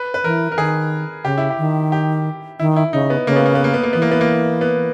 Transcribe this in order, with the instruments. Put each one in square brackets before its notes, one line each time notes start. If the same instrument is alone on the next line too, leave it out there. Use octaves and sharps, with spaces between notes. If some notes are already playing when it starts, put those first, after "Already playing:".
Already playing: [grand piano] B4
B4
[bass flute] E3 [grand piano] A#4
[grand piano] A#4
[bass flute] D#3 [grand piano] G#4
[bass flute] C#3 [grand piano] G4
[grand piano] E4
G4
[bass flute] D#3
[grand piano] G4
[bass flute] D#3 [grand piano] E4
[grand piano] E4
[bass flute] C#3 [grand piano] D#4
[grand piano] B3
[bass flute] C#3 [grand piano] A#3
[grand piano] B3
A#3
B3
A#3
B3
A#3
[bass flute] E3 [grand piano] B3
[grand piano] A#3
B3
A#3
B3